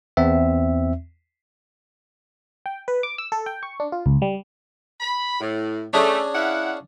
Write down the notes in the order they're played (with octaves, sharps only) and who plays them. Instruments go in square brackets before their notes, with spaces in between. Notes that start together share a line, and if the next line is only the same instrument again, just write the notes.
[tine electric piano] E2 C4 E5
[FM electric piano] G5
B4
D6
E6
A4
G5
C#6
D4
F4
C#2
G3
[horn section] B5
A2
[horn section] A3 [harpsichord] C#4 D4 G#4
[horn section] E4 F5 F#5